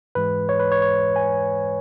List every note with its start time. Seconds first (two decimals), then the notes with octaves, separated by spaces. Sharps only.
0.15 G#2 E3 G#3 B4
0.49 C#5
0.60 B4
0.72 C#5
0.82 C#5
1.16 G#5